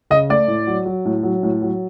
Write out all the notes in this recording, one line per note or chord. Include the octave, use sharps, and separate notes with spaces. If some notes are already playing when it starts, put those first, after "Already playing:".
C#3 D#5
A3 D5
A2
F#3
F#3
A2
F#3
A2
F#3